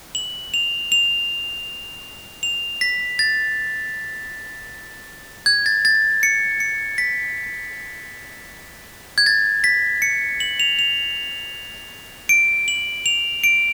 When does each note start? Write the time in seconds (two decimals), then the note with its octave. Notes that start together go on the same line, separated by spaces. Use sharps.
0.15 F#7
0.54 F7
0.92 F7
2.43 F7
2.81 B6
3.19 A6
5.46 G#6
5.66 A6
5.85 A6
6.23 C#7
6.60 C#7
6.98 B6
9.18 G#6
9.26 A6
9.64 B6
10.02 C#7
10.40 F#7
10.60 F7
10.79 F7
12.29 D7
12.68 F#7
13.06 F7
13.44 D7